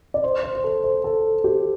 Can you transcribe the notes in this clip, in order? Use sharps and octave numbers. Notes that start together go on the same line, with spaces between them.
D5
C5
C5
C5
A4
C5
A4
G4